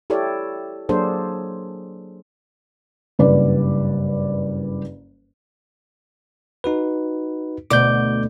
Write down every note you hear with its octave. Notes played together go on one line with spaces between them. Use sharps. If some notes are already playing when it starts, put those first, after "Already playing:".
E4 G4 A4 C#5 D5
F#3 A#3 D4 G#4 A4 C5
F#1 G2 B4 D5
D#4 F#4 B4
D2 B2 D5 D6 G6